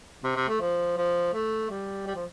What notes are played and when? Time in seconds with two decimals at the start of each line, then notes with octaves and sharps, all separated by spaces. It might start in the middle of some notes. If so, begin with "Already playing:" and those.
0.24 C3
0.36 C3
0.49 A3
0.61 F3
0.97 F3
1.34 A3
1.70 G3
2.07 G3
2.16 F3